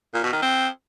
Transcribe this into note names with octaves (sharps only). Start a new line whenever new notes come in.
A#2
B2
D#3
C4